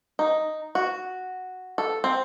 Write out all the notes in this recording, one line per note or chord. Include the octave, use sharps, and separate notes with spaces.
D#4
F#4
A4
C4